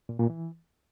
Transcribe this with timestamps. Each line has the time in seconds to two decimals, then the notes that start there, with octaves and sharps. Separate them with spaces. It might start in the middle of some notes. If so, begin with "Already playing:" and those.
0.09 A#2
0.19 A#2
0.30 E3